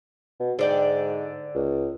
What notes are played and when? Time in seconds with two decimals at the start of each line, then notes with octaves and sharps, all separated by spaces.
0.40 B2
0.59 G#2 D3 D5 G5
1.55 C#2